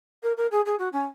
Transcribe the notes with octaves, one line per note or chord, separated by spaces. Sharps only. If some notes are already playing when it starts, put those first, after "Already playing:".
A#4
A#4
G#4
G#4
F#4
C#4